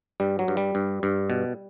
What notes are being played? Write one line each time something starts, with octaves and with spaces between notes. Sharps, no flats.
G2 G3
F#3
G2
G3
G2
G2
B2